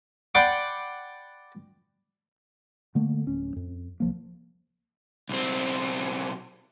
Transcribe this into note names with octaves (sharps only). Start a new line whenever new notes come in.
D5 F#5 G5 B5 C6 D6
D3 A3 A#3
D1 C#4
F2
C2 F3 A#3
B1 C4